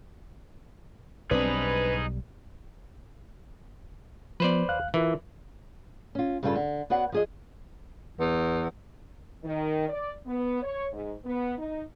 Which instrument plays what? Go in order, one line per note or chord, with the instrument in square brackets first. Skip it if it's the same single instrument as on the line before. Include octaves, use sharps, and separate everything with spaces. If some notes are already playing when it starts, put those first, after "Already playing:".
[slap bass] B1 G3 [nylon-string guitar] C4 D4 [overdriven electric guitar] D#4 G#4 [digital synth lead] B4
[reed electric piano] F3 B3 [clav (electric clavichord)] B4 C5 D5
[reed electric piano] D#2 F5 F#6
[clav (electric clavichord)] E3 [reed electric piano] F4 A#4 E5
[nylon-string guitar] C#4 F4
G2 C#3 G3 E4 F4 A4
D3
B3 F#4 C#5 D5 F#5
F3 G#4 D#5
[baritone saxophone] E2
[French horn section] D#3
D5
B3
C#5
G#2
B3
D#4